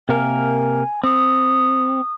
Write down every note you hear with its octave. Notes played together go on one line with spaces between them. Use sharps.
C3 A#3 A#4 G#5
C4 D#6